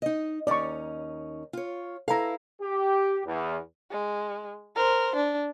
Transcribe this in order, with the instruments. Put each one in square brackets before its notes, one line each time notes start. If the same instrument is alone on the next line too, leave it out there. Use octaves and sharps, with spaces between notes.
[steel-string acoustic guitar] D#4 D#5
[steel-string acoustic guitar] D#2 C#4 D#4 [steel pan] D5 C#6
[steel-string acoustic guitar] F4 C#5
[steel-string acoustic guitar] E4 B4 F5 [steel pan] A4 A#5
[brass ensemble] G4
E2
[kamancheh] G#3
A#4 C5
D4